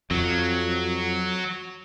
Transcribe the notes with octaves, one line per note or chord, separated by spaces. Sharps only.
F2 F#3